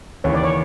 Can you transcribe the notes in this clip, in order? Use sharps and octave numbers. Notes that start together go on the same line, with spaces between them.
D#2 C#3 E3 C#5
D5
C#5